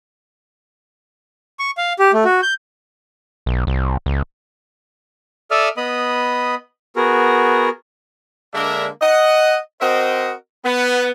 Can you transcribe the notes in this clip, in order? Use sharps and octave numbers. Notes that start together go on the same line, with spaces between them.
C#6
F5
G4
A3
F#4
G6
B1
C2
C#2
A4 D5 E5 D#6 F6
B3 D#5 B5 D#6
B3 F#4 G#4 A#4
D3 G#3 A#3 D4 A#4 E5
D#5 F#5
C4 F#4 A#4 C5 D#5
B3